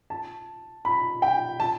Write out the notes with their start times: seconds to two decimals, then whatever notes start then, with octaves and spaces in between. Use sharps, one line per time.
0.10 A5
0.85 B5
1.22 G5
1.60 A5